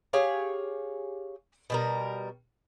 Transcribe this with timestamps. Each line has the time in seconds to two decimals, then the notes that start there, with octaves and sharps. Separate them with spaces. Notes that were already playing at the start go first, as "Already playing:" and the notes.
0.13 G4 G#4 C#5 F5
1.70 B2 G3 A#4